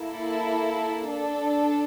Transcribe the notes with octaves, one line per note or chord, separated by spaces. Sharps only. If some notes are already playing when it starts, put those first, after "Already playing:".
Already playing: A#3 E4 A4
D4 A4